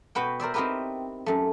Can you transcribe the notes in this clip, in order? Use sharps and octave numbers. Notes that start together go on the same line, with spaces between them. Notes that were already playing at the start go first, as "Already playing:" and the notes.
B2 F#4 B4 F#5 G5
A#4 C5 D5 E5
C4 D#4 E4 G4 A#4 B4
F#2 A3